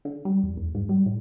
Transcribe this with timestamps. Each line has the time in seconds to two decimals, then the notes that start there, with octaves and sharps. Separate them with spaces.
0.05 D3
0.25 G3
0.43 F2
0.57 E2
0.75 G#2
0.89 G3
1.06 A2